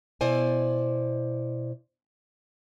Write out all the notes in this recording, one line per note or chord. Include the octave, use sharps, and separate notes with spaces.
B2 E4 C5 D5 G#5